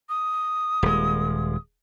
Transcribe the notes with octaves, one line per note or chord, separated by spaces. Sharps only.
D#6
D#1 G#3